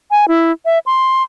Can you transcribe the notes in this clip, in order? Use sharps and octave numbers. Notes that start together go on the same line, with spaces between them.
G#5
E4
E5
C6